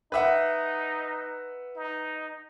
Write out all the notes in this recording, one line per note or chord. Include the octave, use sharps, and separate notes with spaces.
D#4 B4 E5 F#5
D#4